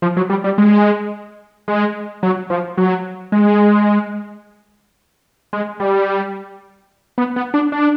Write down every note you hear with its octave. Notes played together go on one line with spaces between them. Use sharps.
F3
F#3
G3
G3
G#3
G#3
F#3
F3
F#3
G#3
G#3
G3
B3
B3
D4
D4